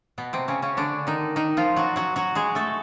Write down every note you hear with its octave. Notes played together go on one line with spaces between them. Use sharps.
B2 B3
C3 C4
C#3 C#4
C#3 C#4
D3 D4
D#3 D#4
D#3 D#4
F3 F4
F#3 F#4
F#3 F#4
F#3 F#4
G#3 G#4
A3 A4